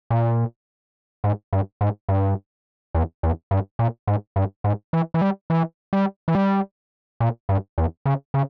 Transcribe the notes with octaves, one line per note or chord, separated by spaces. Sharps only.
A#2
G#2
G2
G#2
G2
E2
E2
G2
A#2
G#2
G2
G#2
E3
E3
G3
E3
G3
E3
G3
A#2
G2
E2
C#3
C#3